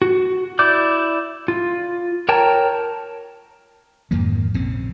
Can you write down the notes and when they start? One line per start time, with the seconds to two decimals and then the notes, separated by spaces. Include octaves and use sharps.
0.02 F#4
0.59 E4 D5 D6 G6
1.48 F4
2.29 A#4 C#5 G5 A5 A#5
4.11 F2 G#2 D#3 A#3
4.54 A#1 C#3 C4